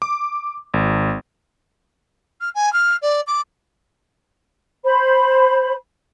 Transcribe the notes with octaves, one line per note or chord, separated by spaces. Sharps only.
D6
G#1
F6
G#5
F6
D5
D6
C5 B5